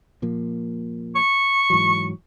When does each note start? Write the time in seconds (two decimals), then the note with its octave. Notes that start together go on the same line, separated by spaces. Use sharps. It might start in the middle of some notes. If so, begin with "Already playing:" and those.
0.22 A#2 F3 A#3
1.16 C#6
1.70 G#2 E3 F#3